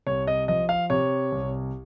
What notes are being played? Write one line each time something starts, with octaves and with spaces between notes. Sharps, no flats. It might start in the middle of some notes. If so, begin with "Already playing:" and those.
C2 C#5
D#5
F3 D#5
F5
C3 C#5
C2